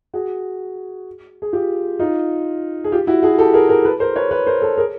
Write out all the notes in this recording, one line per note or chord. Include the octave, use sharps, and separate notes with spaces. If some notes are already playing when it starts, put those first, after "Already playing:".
F#4 G#4
G#4
F4 G4
D#4 F4
G#4
F4 G4
E4 F#4
F#4 G#4
G4 A4
G#4 A#4
G#4 A#4
A4 B4
A#4 C5
B4 C#5
B4 C#5
A#4 C5
A4 B4
G#4 A#4